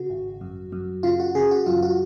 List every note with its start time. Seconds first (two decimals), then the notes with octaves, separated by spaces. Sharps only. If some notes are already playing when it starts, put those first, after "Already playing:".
Already playing: C#3 F#4
0.10 G#1
0.41 F#2
0.72 F#2
1.03 C#3 F4
1.20 F#4
1.35 C#3 G#4
1.51 F#4
1.66 F#2 F4
1.82 F#4